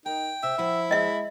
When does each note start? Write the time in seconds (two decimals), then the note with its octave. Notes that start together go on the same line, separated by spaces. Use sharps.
0.06 D#4 A#4 G5
0.43 C3 E5
0.58 F3 E4 F#5
0.91 G#3 D#5 E5